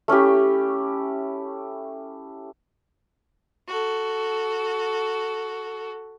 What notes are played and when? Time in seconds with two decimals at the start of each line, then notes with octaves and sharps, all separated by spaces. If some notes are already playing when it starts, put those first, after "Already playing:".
0.08 A3 C#4 E4 G4
3.68 F#4 A4